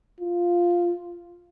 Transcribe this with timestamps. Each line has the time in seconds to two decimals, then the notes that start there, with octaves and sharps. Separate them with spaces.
0.20 F4